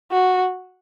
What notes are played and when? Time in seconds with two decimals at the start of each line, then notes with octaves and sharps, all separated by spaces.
0.12 F#4